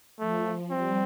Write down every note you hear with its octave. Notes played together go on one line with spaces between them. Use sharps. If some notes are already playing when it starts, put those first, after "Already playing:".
F3 A3
G3 C4